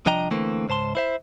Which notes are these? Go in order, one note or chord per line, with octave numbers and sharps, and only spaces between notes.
C2 F3 D4 D#5 G5 A#5
D3 E3 A3 A#3 C4
C#2 G#2 C5 A5 C6
E4 C5 E5